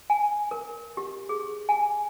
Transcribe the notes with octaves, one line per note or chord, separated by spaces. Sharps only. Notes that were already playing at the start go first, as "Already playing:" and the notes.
G#5
A#4
G4
G#4
G#5